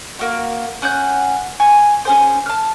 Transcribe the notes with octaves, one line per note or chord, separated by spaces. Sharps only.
A#3 F#4
C#4 F#5 F#6 G6
G#5 C#6
C#4 G#4 C5
A5 F6